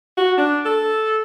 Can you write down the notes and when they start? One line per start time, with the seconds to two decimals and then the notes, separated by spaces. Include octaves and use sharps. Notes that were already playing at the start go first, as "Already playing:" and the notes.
0.18 F#4
0.37 D4
0.65 A4